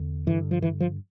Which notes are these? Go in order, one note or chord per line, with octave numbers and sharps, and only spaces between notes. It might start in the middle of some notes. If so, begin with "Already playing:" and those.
Already playing: E2 D3
G2 D3 E3
F3
E3
F3